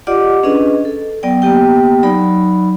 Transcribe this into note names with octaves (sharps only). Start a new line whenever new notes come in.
F4 G4 D5 D#5 F#5 D6
C#4 D4 G#4 B4 D#5
A4
F#3 B3 D5 G5
A#3 B3 G4 G5
F#3 D#4 D5 B5